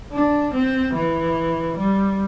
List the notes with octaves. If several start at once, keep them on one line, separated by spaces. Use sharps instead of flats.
D4
C4
E3
G3